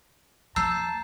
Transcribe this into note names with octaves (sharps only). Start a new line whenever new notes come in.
F3 A#3 A5 A#5 E6 G6 C7